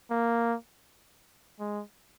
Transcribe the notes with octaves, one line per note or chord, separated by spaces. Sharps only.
A#3
G#3